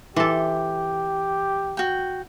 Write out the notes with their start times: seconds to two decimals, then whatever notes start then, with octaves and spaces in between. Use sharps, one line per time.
0.16 E3 G4 A4 C6 D6
1.77 F#4 G5